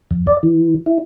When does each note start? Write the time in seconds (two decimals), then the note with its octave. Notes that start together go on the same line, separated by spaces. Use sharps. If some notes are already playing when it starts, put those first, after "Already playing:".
0.11 F2
0.27 D5
0.43 E3
0.86 E4